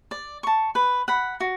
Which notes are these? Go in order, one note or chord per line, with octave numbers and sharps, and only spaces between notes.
D5
A5 C#6
B4
F#5 B5
F#4